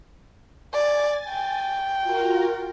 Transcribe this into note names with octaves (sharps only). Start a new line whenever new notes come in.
D5 G#5 A6
G5
F4 F#4 A#4